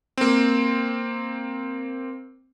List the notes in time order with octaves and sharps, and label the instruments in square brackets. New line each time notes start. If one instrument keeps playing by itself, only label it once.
[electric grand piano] A#3 C4